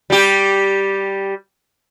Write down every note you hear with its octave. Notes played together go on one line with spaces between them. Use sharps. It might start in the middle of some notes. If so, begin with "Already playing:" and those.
G3 G4